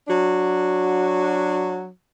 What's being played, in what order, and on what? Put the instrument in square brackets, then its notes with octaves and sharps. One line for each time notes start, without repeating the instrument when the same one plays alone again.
[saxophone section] F#3 D4 F#4